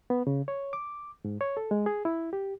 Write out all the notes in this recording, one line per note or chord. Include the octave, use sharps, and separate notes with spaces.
B3
C#3
C#5
D6
G#2
C#5
A4
G#3
G#4
E4
G4